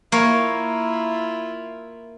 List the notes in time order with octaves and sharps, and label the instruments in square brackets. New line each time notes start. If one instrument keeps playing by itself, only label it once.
[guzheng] A#3 C#5 [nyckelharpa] E4 F4